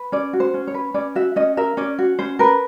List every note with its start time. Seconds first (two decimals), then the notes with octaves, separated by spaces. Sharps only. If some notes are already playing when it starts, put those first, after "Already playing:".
Already playing: B4
0.12 C#4 D5
0.33 F#4
0.40 C5
0.54 C#4
0.67 C#5
0.74 B4
0.94 C#4 D5
1.15 F#4 E5
1.36 C#4 D#5
1.57 A#4 E5
1.77 C#4 D5
1.99 F#4
2.19 C#4 C5
2.39 A#4 B4